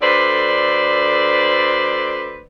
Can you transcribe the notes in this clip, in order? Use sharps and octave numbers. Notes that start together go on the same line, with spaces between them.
D2 D3 B4 C5 D5